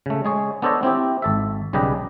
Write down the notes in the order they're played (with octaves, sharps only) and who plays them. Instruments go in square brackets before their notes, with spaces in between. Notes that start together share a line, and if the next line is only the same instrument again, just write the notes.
[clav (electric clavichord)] C#3 A3
G#3 G#4 C#5
B3 D4 A4 C5 C#5 D#5
C4 E4 G4
G#1 A4 E5
B1 C#3 G3 G4 B4 D#5